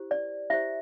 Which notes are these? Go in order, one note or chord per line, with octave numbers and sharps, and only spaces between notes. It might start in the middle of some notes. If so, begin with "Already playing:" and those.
Already playing: E4 G4 C5
D5
E4 G4 C5 E5